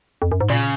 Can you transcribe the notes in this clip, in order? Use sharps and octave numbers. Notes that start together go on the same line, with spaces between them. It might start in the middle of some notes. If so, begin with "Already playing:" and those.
F2
F#2
G#2
A#2 C#3